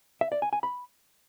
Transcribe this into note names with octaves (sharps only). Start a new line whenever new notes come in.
E5
D5
G#5
G#5
B5